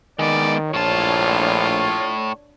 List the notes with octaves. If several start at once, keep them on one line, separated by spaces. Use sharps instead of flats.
D#3 G#3 B3 D5
A#1 A2 D4 F4 C#5 A5